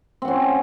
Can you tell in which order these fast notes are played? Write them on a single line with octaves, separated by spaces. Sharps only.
C4 F#5 C#4